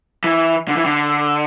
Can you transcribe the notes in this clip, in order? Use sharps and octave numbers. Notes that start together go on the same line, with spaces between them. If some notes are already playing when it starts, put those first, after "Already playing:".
E3
D3
E3
D3